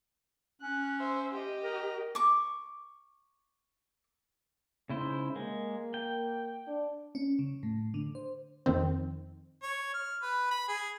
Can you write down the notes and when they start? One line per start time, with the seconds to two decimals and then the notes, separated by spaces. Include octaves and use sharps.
0.61 C#4 F#6
1.00 C5 E5
1.32 G4 D#5
1.63 A#4
2.15 C#6 D6
4.90 G#2 C#3 E4 C5
5.36 G#3 A#3
5.94 G5
6.67 D4
7.15 C#4
7.39 C#3
7.63 A2
7.94 D3
8.15 C5
8.66 F2 D#3 C4
9.63 C#5
9.94 F6
10.22 B4
10.51 B5
10.68 G#4